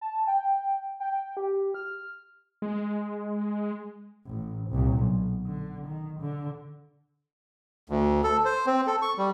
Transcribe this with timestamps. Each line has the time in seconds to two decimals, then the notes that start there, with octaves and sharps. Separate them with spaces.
0.01 A5
0.27 G5
1.00 G5
1.37 G4
1.74 F6
2.62 G#3
4.26 A1
4.70 C2 A#2
4.99 B1
5.46 D3
5.87 D#3
6.20 D3
7.90 D2
8.24 A4
8.45 C5
8.66 C4
8.87 A4
9.02 C#6
9.18 G3